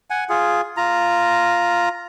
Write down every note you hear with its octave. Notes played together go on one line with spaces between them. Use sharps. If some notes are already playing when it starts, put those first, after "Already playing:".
F#5 G#5
F4 G#4
F4 A#5